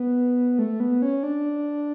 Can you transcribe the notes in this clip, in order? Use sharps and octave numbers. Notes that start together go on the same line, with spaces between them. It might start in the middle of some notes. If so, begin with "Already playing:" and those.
Already playing: B3
A3
B3
C#4
D4